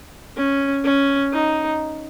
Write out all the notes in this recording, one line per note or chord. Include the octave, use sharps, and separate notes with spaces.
C#4
C#4
D#4